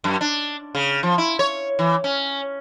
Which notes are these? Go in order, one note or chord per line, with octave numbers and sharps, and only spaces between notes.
F#2
D4
C#3
F3
E4
C#5
E3
C#4